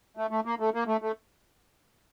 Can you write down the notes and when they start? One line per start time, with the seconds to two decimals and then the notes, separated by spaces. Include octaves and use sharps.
0.17 A3
0.31 A3
0.45 A#3
0.60 A3
0.74 A#3
0.87 A3
1.02 A3